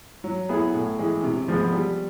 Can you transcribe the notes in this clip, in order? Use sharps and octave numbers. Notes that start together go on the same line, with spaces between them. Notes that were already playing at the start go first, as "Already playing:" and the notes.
F#3
B3 E4 G#4
A2
E3 G#3
C3
F3 G#3 B3
G3